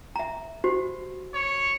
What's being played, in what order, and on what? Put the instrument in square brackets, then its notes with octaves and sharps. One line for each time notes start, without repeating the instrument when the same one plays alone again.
[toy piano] E5 A#5
F#4 G4 C5
[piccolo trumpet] C#5